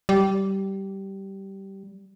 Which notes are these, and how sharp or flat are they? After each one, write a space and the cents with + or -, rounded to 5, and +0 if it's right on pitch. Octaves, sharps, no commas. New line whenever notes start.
G3 -15